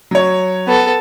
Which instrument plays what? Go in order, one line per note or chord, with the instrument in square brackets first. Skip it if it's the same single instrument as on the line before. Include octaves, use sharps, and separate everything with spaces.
[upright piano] F#3 C#5
[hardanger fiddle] B3 A4